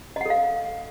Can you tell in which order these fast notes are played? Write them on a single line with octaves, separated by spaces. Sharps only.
D#5 F#5 A4 F5